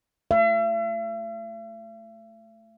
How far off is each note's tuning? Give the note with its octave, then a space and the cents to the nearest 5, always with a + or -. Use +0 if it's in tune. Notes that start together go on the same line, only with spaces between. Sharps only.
A3 +0 E5 +45